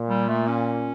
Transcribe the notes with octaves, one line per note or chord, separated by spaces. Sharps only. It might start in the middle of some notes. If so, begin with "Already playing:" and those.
Already playing: A#2
G3
A3
C#4